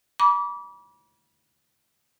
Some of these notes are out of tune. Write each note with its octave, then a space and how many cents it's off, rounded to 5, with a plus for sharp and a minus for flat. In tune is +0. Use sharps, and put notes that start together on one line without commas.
B5 -40 D6 -25